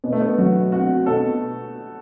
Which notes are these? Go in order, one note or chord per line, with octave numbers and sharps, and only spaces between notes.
B2 B3
A3
B3
F#3 F#4
C4 F#4
B2 A4